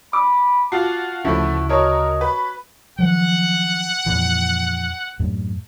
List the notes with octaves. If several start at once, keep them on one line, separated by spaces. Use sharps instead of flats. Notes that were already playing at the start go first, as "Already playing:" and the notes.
B5 D6
F4 F#4 A5 C7
D2 C#3 F3 A3 E4 F#4
F#4 A#4 C#5 D#5 A5
B4
D#3 F3 F#3 F#5
F2 A#2 E3
F#2 A2